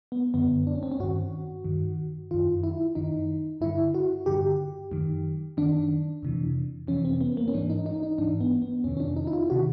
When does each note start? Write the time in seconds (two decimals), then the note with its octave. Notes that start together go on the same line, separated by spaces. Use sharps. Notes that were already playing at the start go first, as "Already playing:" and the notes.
0.12 B3
0.34 F#2 D3 B3
0.67 D4
0.75 C#4
0.83 C4
0.92 C#4
1.00 G2 D#3 F#4
1.65 G2 D#3
2.31 F#2 D#3 F4
2.63 E4
2.95 F#2 D#3 D#4
3.61 G2 D3 E4
3.94 F#4
4.26 G2 D3 G4
4.92 F#2 D#3
5.57 F#2 D#3 D4
6.23 F2 C3 E3
6.88 F2 C3 E3 C#4
7.05 C4
7.21 B3
7.37 A#3
7.48 C#4
7.54 G#2 E3 D4
7.70 D#4
7.86 D#4
8.03 D#4
8.18 G#2 E3 D4
8.41 B3
8.62 B3
8.84 F2 C3 D#3 C#4
8.97 C#4
9.00 D4
9.16 D#4
9.27 E4
9.33 F4
9.50 C3 D#3 F#4